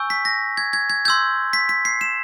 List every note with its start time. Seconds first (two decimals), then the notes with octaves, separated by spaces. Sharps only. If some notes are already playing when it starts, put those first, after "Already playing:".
Already playing: G#5 C#6 E6 G6
0.10 B6
0.25 A#6
0.57 G#6
0.73 G#6
0.90 G#6
1.05 C6 E6 G6 G#6
1.53 B6
1.69 B6
1.85 C7
2.01 E7